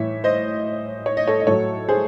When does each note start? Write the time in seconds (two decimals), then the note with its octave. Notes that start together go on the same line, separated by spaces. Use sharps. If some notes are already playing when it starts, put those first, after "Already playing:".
Already playing: A2 E3 C#5 E5
0.24 C5 D#5
1.06 C#5
1.17 D#5
1.27 A4 C#5
1.40 D#5
1.47 A2 F#3 A4 C#5
1.89 G#4 C5